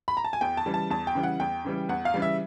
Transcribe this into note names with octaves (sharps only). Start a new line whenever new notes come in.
B5
A#5
A5
G#5
E2 G5
A5
C#3 E3 G3
A5
E2 A5
G5
C#3 E3 G3
F#5
E2 G5
C#3 E3 G3
E2 F#5
F5
C#3 E3 G3
E5